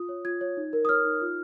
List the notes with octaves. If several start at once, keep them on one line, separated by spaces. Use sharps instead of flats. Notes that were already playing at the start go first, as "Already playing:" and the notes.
Already playing: F4 D#6
C#5
F4 G#6
C#5
D#4
A#4
D#6
C#5 F6
D#4
F4